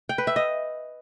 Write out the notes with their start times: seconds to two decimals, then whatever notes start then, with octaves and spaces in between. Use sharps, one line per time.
0.09 G5
0.18 B4
0.27 E5
0.36 D#5